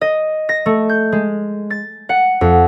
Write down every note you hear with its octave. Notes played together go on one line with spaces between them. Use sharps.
D#5
A#6
A3
G6
G#3
A6
F#5
F2